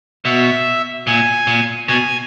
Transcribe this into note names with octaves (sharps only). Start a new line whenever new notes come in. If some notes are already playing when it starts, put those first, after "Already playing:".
B2 E5
A#2 G#5
A#2
B2 G#5